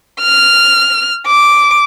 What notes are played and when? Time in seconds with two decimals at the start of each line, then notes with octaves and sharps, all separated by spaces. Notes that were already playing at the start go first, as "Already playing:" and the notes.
0.22 F6
1.27 D6